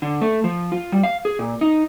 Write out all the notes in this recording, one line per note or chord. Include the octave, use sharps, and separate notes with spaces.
D3
A3
F3
F4
G3
F5
G#4
A#2
D#4